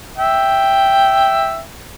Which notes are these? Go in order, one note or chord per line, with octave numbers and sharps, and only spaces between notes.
E5 G5